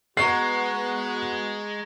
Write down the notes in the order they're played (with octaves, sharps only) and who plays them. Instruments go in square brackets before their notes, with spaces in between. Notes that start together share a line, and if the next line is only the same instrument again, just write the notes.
[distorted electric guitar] G#3 [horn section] B3 F#4 [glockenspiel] A#5 C#6 F#7 [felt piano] C7